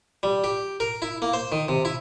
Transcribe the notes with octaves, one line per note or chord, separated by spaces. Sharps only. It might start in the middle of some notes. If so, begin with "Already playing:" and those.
G3
G4
A#4
E4
A#3
C5
D#3
C3
E4